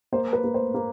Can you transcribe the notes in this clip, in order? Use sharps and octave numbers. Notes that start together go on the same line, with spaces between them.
A#3 C5
B4
A#3
C5
A#3